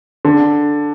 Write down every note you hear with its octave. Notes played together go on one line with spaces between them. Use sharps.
D3